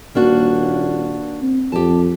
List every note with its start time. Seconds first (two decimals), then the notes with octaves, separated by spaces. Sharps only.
0.15 D#1 A#3 D4 F#4
1.42 C4
1.72 F2 G4 A5